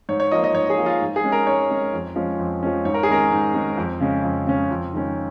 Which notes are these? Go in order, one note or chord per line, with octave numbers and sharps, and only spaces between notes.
G#2 C#5
C#5
F3 A#3 D#5
D#5
G#2 C#5
G#4
F3 A#3
F4
G#2
G#4
G#3 C#4
A#4
G#2 C#5
G#3 C#4
F2
F3 G#3 C#4
F2
F3 G#3 C#4
G#2 C#5
A#4
G#4
D#3 G#3 C#4 A#4
G#2
D#3 G#3 C#4
F2
C#3 G#3 C#4
F2
C#3 G#3 C#4
F2
D#3 G#3 C#4